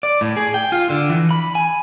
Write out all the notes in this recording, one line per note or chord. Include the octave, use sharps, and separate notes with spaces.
D5
A2
G#4
G5
F4
D3
E3
B5
G#5